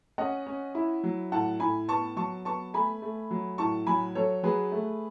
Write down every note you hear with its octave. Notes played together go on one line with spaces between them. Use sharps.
C#4 D#5 F#5
C#4
E4
F#3
A2 F#5 A5
A2 G#5 B5
B3 A5 C#6
F#3 A5 C#6
B3 A5 C#6
A3 G#5 B5
A3
F#3
A2 A5 C#6
F#3 G#5 B5
F#3 A4 C#5
F#3 G#4 B4
A3